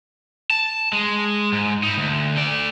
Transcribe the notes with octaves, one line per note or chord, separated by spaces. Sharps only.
A5
G#3
G#2
D#4 E4
D2
A3 D5